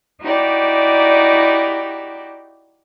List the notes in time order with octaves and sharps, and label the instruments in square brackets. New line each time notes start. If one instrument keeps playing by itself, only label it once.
[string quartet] D#4 E4 F#4 G4 D5